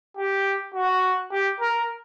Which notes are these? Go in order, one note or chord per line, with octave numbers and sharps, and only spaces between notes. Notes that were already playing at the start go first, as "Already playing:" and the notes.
G4
F#4
G4
A#4